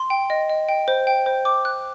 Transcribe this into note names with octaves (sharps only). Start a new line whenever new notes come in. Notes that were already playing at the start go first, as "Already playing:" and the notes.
Already playing: C6
G5
D#5
D#5
G5
C5
G5
C5
D6
F#6